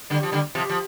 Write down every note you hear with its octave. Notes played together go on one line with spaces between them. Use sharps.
D3 G3
F3
D3 G3
C3 F3
F3